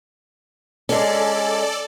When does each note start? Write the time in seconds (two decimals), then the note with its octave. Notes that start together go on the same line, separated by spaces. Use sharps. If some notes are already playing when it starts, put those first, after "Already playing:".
0.89 G#3 C#4 A4 D5